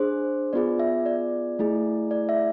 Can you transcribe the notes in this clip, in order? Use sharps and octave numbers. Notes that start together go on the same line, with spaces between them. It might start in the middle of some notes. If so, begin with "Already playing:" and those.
Already playing: D4 G#4 C5
B3 F4 G#4 D5
E5
D5
A3 E4 G#4
D5
E5